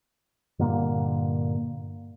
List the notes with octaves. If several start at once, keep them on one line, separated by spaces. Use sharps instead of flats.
G2 A#2 D3 A#3